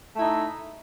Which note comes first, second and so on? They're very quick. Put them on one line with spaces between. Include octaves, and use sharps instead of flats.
A3 E4 D#4